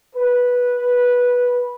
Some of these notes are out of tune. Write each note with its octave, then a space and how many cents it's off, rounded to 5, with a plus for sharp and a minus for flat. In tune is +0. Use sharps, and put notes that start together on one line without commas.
B4 -10